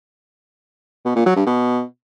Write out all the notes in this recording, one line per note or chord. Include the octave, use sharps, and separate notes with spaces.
B2
A#2
F#3
G2
B2